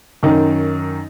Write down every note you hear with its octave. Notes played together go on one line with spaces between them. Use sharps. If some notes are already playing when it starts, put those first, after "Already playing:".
F#2 D#3 D#4